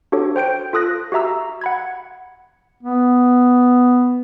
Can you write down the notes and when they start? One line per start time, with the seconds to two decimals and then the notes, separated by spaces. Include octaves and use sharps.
0.12 D4 F#4 G4 A4 C#5
0.36 C5 G5 G6 D7
0.73 F4 A4 D#6 F#6 A#6
1.12 F#4 G4 E5 A#5 E6
1.61 F#5 B5 G#6
2.83 B3